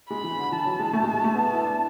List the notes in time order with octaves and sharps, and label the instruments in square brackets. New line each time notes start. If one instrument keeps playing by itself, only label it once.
[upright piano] G#3 [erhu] B5
[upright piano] E3
D3
[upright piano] E3 [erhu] A5
[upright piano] F#3
G#3
A3
G#3
G#3
A3
B3
E4
D4